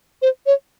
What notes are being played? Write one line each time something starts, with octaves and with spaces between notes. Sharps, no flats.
C5
C#5